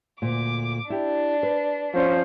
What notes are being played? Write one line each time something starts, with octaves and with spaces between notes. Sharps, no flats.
D2 A#2 D6
D4 E4 G4
B4
F3 C#4 C5